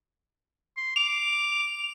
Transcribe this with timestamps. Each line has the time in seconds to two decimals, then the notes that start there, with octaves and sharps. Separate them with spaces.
0.77 C6
0.96 D6 F7